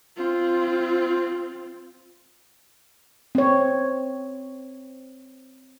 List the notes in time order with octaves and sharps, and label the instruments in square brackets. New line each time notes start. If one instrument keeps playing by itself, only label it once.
[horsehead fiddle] C4 F4
[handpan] C4 C#5